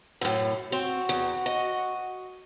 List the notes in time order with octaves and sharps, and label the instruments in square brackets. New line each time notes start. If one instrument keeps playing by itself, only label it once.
[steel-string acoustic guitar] F#2 A2
[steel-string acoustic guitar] C4 [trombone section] F#4
[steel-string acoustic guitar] E2
D#5